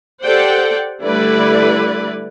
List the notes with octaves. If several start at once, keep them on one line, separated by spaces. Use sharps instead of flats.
G4 A4 C5 D5 F#5 G5
D3 G3 A3 E4 B4 D5